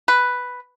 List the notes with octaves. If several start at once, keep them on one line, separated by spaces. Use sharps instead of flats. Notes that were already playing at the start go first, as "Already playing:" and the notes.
B4